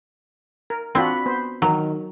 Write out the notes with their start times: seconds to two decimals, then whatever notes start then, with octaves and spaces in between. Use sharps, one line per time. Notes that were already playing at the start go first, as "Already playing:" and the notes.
0.70 A#4
0.95 C4 D4 F4 F#4 B5
1.26 B3 C5
1.62 D#3 F#3